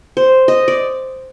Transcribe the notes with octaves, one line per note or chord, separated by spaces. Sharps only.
C5
D#5
D5